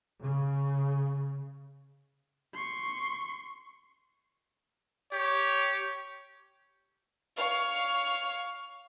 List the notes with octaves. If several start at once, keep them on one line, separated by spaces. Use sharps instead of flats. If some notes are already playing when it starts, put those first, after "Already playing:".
C#3
C6 C#6
G4 C#5
C#5 F5